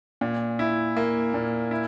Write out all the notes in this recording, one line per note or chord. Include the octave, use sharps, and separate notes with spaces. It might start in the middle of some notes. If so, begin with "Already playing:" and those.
A#2
E4
A#3
A#2
E4